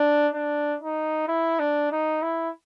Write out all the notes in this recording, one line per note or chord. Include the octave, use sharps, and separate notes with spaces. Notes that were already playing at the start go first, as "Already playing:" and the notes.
Already playing: D4
D4
D#4
E4
D4
D#4
E4